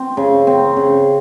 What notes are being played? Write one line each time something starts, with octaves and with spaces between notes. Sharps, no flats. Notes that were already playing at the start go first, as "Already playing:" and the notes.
Already playing: C4
C#3
C4
C#3